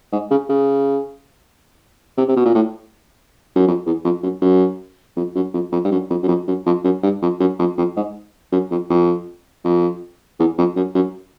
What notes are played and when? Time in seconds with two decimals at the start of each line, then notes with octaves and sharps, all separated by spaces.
0.12 G#2
0.31 C#3
0.49 C#3
2.17 C3
2.29 C3
2.36 B2
2.45 A#2
2.55 A2
3.56 F#2
3.67 F2
3.86 E2
4.04 F2
4.23 F#2
4.42 F#2
5.16 F2
5.35 F#2
5.54 F2
5.72 F2
5.85 G2
5.91 F#2
6.10 F2
6.23 F#2
6.28 F2
6.47 F#2
6.66 F2
6.84 F#2
7.03 G2
7.22 F2
7.40 F#2
7.59 F2
7.78 F2
7.97 G#2
8.52 F#2
8.71 F2
8.90 F2
9.65 F2
10.40 E2
10.58 F2
10.76 F#2
10.95 F#2